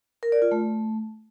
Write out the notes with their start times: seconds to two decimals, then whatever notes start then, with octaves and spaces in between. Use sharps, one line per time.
0.23 A#4
0.32 D5
0.42 F4
0.51 A3